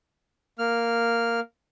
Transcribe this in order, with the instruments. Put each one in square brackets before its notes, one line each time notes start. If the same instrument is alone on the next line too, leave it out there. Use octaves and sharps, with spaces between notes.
[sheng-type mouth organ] A#3 F6